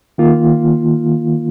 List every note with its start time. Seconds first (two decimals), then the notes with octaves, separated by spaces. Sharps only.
0.18 D#3 A#3 F4